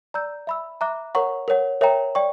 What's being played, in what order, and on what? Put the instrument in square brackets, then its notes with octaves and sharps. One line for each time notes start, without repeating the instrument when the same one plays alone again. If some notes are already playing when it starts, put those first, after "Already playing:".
[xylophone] D5 A#5 E6 G6
E5 B5 E6
E5 A#5 D6 F#6
A#4 C#5 F#5 A#5 C#6
A#4 C#5 F#5
A#4 C#5 E5 G5 A#5
D5 G5 C#6